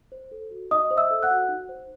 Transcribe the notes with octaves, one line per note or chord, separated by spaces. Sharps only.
C5
A4
F#4
D#4 D#5 D#6
C5
E5 E6
A4
F#5 F#6
F#4
D#4
C5